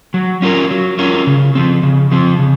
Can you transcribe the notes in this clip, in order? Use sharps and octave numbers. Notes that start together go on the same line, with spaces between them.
F#3
C#4 F4 A#4
F#3
C#4 F4 A#4
C#3
F3 C4
C#3
F3 C4
C#3